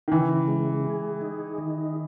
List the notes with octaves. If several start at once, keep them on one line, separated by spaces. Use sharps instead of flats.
D#3
C#3 E3
G#3
G#4
D#4
D#3